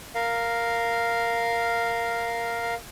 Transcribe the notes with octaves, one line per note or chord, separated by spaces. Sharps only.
A#4 F5